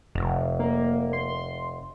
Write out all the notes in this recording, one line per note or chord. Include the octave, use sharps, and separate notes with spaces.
F1
A#3
C6